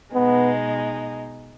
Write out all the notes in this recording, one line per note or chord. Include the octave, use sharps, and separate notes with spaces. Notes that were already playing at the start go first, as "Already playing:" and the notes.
B2 G#3 B3 D#4